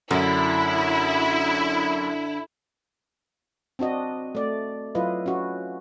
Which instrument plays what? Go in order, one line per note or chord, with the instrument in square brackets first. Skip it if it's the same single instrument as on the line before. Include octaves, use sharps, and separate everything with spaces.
[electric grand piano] F#2 [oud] D3 [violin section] E4
[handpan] C4 D4 F#4 D#5
A3 D5
F#3 E4 F4 B4 D#5
C#4 F#4